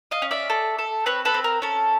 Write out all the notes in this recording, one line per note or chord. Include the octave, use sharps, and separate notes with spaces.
D#5 F5
C#4
D5 E5
A4
A4
C4 B4 C#5
A4 B4
C4
A#4
C#4 A4